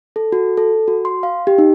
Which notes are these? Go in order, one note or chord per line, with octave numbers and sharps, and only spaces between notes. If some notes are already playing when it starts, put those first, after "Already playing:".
A4
F#4
A4
F#4
C6
F5
G4
D#4